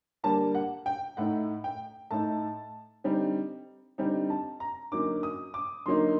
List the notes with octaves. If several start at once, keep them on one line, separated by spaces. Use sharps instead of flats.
D3 G3 A#3 D4 A5
F#5
G5
A2 A3 D#4 F#5
G5
A2 A3 D#4 A5
D3 G3 C4 D#4
D3 G3 C4 D#4
A5
A#5
F#2 D3 F#3 A#3 D#4 D6
D#6
D6
F#2 D3 F#3 A#3 D#4 C6